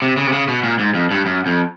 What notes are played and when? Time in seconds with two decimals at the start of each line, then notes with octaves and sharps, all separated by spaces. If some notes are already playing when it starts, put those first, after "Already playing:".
0.02 C3
0.17 C#3
0.27 C3
0.33 C#3
0.48 B2
0.64 A#2
0.79 G#2
0.94 F2
1.11 G2
1.26 F#2
1.46 F2